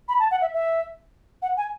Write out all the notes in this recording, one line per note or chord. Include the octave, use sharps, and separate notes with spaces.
B5
A5
F#5
E5
E5
F#5
G#5